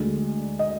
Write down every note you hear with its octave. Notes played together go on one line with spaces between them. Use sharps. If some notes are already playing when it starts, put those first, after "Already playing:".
Already playing: D2 D3 G#3
D#5